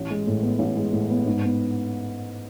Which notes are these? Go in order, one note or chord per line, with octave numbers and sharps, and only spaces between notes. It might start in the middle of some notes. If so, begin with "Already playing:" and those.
Already playing: A1
G#3
A2
B3
A1
G#3
A2
B3
G#2
B3